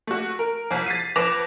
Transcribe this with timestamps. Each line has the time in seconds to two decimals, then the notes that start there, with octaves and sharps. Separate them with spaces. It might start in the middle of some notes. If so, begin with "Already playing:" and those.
0.07 A3 F#4
0.39 A#4
0.71 C2 F2
0.86 A6 B6 C7 D#7
1.16 F2 B4 D6 A#6 E7 F7